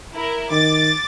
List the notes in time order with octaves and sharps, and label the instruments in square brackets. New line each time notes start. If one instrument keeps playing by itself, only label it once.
[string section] E4 A#4
[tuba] D#3 [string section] D6 A6